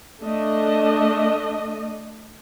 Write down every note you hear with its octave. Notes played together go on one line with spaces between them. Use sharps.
A3 D4 D#5